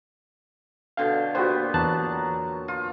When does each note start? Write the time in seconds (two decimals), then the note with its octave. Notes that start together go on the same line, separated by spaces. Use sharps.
0.97 B2 D3 F5 G5
1.35 A#2 B3 F#4 G4 C5
1.74 E2 F#3 A5 F#6
2.68 F4